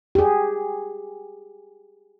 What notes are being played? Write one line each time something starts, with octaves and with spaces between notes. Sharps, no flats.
G4 G#4